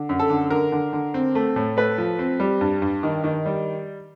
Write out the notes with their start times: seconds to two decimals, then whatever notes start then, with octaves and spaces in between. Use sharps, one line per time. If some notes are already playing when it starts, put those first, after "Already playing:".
Already playing: D3
0.09 F#2
0.19 A4
0.30 D3
0.50 D3 A#4
0.72 D3
0.93 D3
1.14 C4
1.35 A3
1.56 A2
1.77 A3 B4
1.98 F3
2.19 C4
2.40 G3
2.61 G2
2.82 G2
3.03 D#3
3.24 D#3
3.46 G3